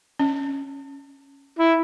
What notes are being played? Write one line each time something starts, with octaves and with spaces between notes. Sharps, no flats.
C#4
E4